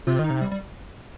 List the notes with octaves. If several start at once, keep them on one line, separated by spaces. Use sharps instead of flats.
C3 F4
D#3
D#4
C3
G3
G3